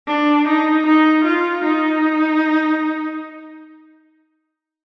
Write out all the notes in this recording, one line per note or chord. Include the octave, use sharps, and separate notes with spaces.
D4
D#4
D#4
F4
D#4